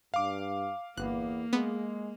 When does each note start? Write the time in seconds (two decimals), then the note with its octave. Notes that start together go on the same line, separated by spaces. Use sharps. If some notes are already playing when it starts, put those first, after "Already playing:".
0.14 G2 F5 D6
0.97 G1 E2 A#3 B3 F#6
1.53 G#3 B3